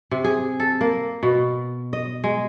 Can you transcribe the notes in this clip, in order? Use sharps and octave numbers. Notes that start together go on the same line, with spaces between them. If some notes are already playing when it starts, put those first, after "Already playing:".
C3
G#4
A4
A#3
B2
D#5
G#3